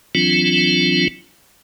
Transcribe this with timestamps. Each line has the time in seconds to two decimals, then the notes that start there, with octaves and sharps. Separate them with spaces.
0.15 E3 F#3 C4 D4 F4